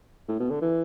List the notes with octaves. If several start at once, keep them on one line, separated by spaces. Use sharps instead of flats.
A2
B2
D3
E3